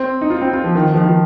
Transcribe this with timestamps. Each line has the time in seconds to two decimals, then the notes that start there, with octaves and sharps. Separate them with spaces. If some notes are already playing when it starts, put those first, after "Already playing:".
Already playing: C4
0.21 D#4
0.30 F4
0.42 C4
0.53 F4
0.64 F3
0.75 D#3
0.87 D#3
0.94 F3
0.97 D#3
1.09 F3